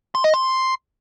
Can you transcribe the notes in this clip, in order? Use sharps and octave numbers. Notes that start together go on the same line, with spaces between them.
C6
D#5
C6